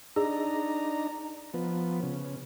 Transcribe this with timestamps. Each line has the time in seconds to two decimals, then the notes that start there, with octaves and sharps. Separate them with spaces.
0.16 D4 D#4 G#4 A#5
1.54 F3 B3
2.03 C#3